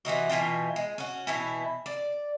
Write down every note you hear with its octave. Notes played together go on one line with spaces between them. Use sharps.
C3 E3 D#4 F#4
B2 E3 F4 G5
G#3
C#4 F#4
B2 E3 E4
D5